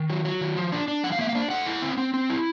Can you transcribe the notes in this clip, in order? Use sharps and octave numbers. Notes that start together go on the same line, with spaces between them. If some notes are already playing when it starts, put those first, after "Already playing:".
Already playing: D#3
F#3
F#3
D#3
F3
D4
D4
F3 F#5
F5
A#3 E5
F5
D4
A3 F#5
E4
C4
C4
C4
E4